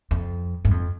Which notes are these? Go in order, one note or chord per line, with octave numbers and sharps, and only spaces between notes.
F2
G2
F2